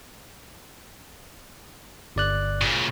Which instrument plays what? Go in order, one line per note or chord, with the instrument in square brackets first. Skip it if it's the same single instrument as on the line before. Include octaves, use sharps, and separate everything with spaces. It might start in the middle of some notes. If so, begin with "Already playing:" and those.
[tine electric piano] G1 D5 F#6
[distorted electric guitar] A#2 C#3